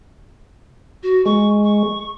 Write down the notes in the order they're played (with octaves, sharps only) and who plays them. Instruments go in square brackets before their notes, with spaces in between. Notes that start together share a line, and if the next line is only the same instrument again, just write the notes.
[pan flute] F#4
[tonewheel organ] G#3 [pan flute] C#6
[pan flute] C#6